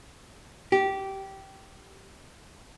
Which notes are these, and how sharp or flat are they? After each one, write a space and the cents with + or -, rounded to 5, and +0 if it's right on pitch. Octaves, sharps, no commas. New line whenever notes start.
G4 -15